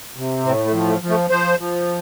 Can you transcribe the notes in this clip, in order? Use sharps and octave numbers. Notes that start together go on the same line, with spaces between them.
C3
A2 C4
A3
F3
A3
F3
A3
F3 C5
F3